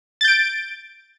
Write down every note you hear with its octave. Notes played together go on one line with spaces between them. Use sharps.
G6 A6 D7